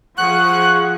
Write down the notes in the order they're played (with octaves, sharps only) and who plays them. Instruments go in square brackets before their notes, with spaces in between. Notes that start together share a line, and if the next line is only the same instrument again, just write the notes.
[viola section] F3 G#4 [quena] F#5 [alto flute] C#6 [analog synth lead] F#6